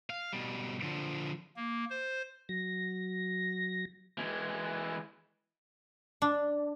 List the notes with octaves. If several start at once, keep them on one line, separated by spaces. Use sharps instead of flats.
F5
B2 G3
D3 F3
A#3
C5
F#3 A#6
E3 G#3
D4